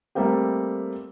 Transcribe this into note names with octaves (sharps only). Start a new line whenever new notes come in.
G3 A3 A#3 C4 G4